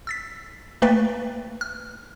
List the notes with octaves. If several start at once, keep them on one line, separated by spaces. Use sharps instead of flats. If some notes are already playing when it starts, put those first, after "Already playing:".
E6 A6 B6
A3 A#3 B4 G5 A6 B6
F6